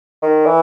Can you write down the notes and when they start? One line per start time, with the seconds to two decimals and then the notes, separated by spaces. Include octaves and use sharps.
0.23 D#3
0.46 E3